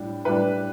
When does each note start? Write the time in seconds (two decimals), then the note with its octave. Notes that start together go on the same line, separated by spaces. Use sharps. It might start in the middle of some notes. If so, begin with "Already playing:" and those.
Already playing: A2 G3 D4
0.25 A2 G3 D4 B4